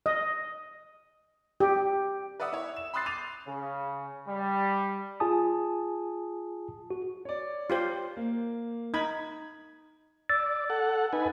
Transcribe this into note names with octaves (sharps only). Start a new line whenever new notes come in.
D#5
G4
B4 D5 E5 F#5 D#6 E6
E4 C#5
E7
B5 C6 D#6 F#6 A6 C7
D6 G6 A6 C7 D#7 F7
C#3
G3
F4 G#4 G#5 A5 D#6
F#4
C#5 D5
F4 G4 C5
A#3
D#4 B5 G#6
D5 E6 A6
A4 F#5
D#4 B4 G#5